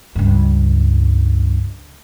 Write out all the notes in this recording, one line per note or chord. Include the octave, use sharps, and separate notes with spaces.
C#2 G2